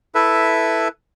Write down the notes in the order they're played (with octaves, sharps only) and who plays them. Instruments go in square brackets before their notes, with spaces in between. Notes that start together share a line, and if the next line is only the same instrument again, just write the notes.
[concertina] E4 A4 B4 E5